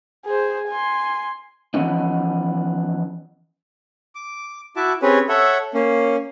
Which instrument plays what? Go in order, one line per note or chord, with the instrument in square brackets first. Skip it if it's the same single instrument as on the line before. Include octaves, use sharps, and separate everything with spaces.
[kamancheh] G#4 C5
G#5 C6
[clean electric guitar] E3 F3 A3 B3 C#4 D#4
[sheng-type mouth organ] D6
E4 F#4 E5 A5 D6
C4 C#4 G4 G#4 B4 C#5
A4 C#5 E5 F#5
A#3 C#4